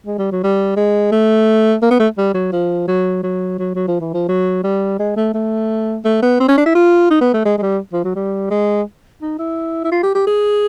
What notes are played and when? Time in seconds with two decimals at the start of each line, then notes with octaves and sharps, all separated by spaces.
0.06 G#3
0.18 G3
0.32 F#3
0.43 G3
0.76 G#3
1.12 A3
1.82 A#3
1.91 B3
2.00 A3
2.18 G3
2.34 F#3
2.53 F3
2.88 F#3
3.23 F#3
3.59 F#3
3.75 F#3
3.88 F3
4.01 E3
4.14 F3
4.28 F#3
4.64 G3
4.99 G#3
5.16 A3
5.34 A3
6.05 A3
6.23 B3
6.40 C4
6.48 C#4
6.58 D4
6.66 E4
6.75 F4
7.10 D#4
7.21 B3
7.34 A3
7.45 G#3
7.58 G#3
7.62 G3
7.93 F3
8.04 F#3
8.16 G3
8.51 G#3
9.22 D#4
9.39 E4
9.84 E4
9.92 F4
10.03 G4
10.15 G4
10.27 G#4